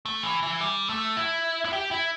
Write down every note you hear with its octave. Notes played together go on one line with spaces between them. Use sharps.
A3
E3
E3
G3
A3
E4
E4
G4
E4